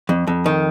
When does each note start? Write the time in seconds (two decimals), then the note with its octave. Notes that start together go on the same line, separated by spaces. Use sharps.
0.09 F2
0.27 F2
0.46 D#3